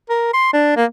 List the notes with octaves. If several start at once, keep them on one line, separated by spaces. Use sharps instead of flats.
A#4
C6
D4
A#3